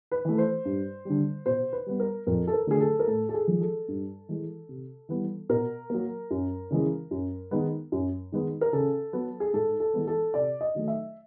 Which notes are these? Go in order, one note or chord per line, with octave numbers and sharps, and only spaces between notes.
B4
E3 A3
C5
G2
D3 G3
B2 C5
B4
G3 B3
A#4
F2 A#4
A4
A#4
D3 F#3 A3 G#4
A4
A#4
A2 A4
A4
G#4
F3 G#3
A4
G2
E3 G#3
C3
E3 G3 B3
B2 A#4
F#3 A#3
F#2
C#3 E3 G#3
F#2
D#3 G#3 B3
F#2
D#3 G#3 B3
A#4
C#3 A4
F#3 B3
G#4
G#2 A4
A4
E3 G#3 B3
A4
C3 D5
D#5
D#3 F#3 A3
E5